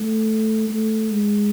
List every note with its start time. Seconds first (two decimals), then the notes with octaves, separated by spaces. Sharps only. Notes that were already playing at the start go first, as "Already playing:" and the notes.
Already playing: A3
0.69 A3
1.11 G#3